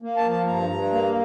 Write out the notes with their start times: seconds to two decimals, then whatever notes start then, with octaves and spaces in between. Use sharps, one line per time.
0.02 A#3
0.17 A5
0.24 F3
0.32 A5
0.47 G2 A#5
0.70 G2
0.92 A#3